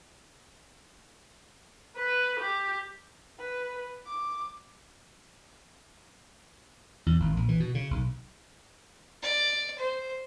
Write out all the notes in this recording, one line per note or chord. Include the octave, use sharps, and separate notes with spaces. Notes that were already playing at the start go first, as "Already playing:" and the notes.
B4
G4
B4
D6
E2
G#1
A#1
E3
B2
C#3
B1
D5
C5